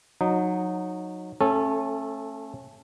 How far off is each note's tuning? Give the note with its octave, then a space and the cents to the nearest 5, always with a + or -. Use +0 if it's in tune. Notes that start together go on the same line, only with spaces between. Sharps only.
F#3 -20 D#4 -10
A3 +15 C#4 -30 A4 -10